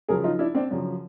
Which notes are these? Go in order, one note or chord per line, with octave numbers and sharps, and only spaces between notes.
F#2 C#3 F3 G#4 A#4
D#4 F4
D4 E4
C4 D4
F#2 C#3 F3